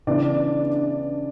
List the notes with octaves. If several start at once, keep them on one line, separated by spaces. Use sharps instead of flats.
C#3 E3 B3 D4 D5